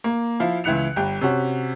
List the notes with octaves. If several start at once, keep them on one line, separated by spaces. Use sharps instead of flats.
A#3
F3 E4 F5
C#2 E3 E4 F#6 C#7 F7
G1 G3 G5
C3 C#4 F#4